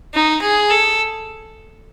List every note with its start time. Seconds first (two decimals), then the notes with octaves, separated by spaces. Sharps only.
0.14 D#4
0.41 G#4
0.70 A4